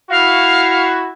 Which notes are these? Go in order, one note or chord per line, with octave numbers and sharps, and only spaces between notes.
E4 F#4 F5